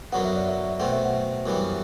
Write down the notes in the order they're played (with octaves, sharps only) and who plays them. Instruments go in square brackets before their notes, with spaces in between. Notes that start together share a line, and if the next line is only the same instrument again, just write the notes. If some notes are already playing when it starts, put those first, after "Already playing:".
[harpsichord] F#2 D3 F#3 B3 [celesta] F#5
[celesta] E5
D5
E5
[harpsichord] B2 A3 C4 [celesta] F#5
[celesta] E5
F#5
[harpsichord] F#2 E3 G3 B3